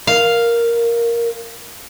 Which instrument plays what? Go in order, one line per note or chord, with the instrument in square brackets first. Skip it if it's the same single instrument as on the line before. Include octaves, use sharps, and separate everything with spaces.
[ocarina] A#4 [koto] F5